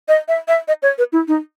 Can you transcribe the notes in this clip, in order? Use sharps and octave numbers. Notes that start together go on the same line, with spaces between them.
D#5
E5
E5
D#5
C#5
B4
E4
D#4